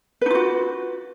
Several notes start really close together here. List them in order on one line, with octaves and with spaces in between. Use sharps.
B4 D#4 F4 F#4